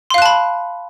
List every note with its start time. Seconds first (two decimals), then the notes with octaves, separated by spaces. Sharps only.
0.10 C6
0.14 F5
0.18 F#6
0.22 A5
0.26 B5